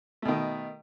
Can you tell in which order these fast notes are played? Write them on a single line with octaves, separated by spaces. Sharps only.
A3 B2 D#3